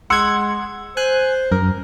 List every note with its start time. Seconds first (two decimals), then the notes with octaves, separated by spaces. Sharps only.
0.10 G#3 F#5 C6 E6 G#6 C#7
0.97 C5 G#5 F#6
1.52 F#2 A#4